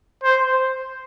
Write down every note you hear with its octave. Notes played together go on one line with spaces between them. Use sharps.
C5